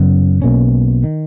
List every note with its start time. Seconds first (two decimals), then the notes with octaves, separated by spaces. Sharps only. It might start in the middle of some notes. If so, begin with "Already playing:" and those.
Already playing: F#2 C#3 F#3 B3
0.42 B1 B2 A#3 C#4
1.04 D#3